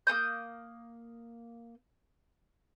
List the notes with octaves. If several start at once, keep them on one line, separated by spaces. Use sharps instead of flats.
A#3 A4 D#6 G6